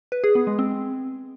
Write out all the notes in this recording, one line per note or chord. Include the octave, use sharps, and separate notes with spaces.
B4
G#4
B3
G#3
C4